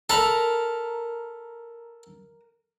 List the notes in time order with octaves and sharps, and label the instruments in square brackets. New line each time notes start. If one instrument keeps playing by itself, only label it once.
[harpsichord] A4 B5 [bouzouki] A#4